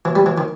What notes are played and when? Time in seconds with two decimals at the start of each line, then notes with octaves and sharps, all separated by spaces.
0.05 E3
0.15 G3
0.26 E3
0.38 D#3